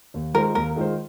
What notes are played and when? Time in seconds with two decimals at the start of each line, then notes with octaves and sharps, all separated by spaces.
0.14 D#2
0.34 D#3 G#3 F4 A#4 C5
0.55 D#2 A#4
0.76 D#3 G#3 F4 C5